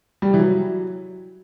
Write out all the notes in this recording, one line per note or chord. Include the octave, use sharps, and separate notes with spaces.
G3
E3
F#3